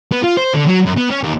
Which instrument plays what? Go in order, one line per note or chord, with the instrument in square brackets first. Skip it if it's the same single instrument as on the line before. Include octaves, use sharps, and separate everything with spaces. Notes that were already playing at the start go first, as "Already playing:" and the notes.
[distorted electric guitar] B3
F4
C5
D3
F#3
F#2
B3
C#4
D#2